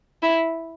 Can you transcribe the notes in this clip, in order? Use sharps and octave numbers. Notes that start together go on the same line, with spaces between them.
E4